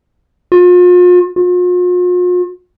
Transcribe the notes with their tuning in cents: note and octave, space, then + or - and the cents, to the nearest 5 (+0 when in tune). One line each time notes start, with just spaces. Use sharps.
F4 +40
F4 +45